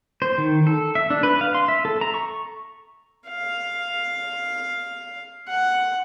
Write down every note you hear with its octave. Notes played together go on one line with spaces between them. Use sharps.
C5
D#3
A4
E5
D4
B4
F5
C6
E5
A4
A#5
C#6
F5
F#5